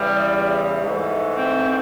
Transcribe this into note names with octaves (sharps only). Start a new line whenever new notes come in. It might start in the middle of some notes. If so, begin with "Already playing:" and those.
Already playing: E2 C#3 E3 G3
G#2 E3 A3
C4
C4